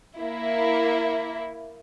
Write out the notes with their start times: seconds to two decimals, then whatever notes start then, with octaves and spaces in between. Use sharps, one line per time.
0.17 A#3 E4